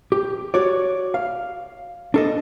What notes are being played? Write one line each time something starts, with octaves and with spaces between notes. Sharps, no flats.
G4
F#4 C#5 D5
F5
D4 A4 D#5